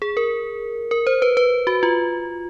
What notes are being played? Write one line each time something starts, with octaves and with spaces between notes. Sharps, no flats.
G#4
A#4
A#4
C5
B4
B4
F#4
F4